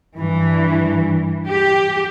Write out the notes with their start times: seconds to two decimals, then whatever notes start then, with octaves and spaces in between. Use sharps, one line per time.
0.17 G2 E3
1.48 G4